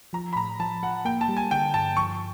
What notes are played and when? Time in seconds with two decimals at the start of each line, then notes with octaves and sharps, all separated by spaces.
0.13 F3 A#5
0.33 B5
0.36 A2 A#5
0.59 F3 A5
0.83 F3 F#5
1.05 A#3 G5
1.21 A5
1.28 G3
1.37 G#5
1.51 D3 G5
1.74 G2 A5
1.97 F3 C#6